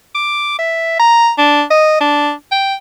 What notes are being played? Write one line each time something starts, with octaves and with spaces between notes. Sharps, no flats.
D6
E5
A#5
D4
D#5
D4
G5